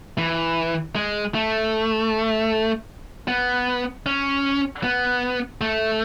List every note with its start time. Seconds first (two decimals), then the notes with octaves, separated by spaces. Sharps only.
0.18 E3
0.96 G#3
1.35 A3
3.28 B3
4.06 C#4
4.84 B3
5.61 A3